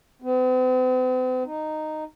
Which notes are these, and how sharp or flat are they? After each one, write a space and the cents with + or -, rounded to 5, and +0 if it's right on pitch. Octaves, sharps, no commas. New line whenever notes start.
C4 -45
D#4 -10